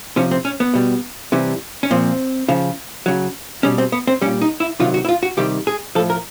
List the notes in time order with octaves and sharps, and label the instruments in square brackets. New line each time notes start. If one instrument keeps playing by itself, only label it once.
[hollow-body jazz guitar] C3 F3 C#4
C4
C#4
B3
B2 G3
C3 E3 G3
C#4
A#2 F3 C4
C#3 F3
C#3 F#3
B2 G3 C#4
C4
B3
C4
G3 C#4
A#2
D#4
E4
C3 D#3 F#3 F4
F#4
E4
F4
F#4
C3 D#3 G3 G4
G#4
F3 A4
A2
A#4